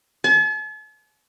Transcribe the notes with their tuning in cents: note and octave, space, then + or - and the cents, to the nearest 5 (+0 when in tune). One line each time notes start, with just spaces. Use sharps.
A5 -45